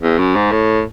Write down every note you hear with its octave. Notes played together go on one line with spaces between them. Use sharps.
E2
F#2
G#2
A2